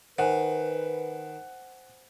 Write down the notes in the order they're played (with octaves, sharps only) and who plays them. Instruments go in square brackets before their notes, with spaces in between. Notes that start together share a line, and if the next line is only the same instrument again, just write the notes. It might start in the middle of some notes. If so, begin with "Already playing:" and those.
[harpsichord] D#3 [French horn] B4 [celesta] C5 G#5 [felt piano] F#5